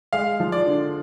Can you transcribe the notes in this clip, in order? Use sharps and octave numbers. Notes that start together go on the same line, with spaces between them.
G#3 F5
F3
D5
D3